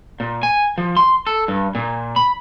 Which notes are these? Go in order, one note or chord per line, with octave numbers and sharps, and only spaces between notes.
A#2
G#5
F3
C6
A4
G2
A#2
B5